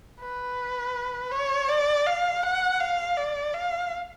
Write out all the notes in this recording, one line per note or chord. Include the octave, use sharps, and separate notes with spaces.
B4
C#5
D5
F5
F#5
F5
D5
F5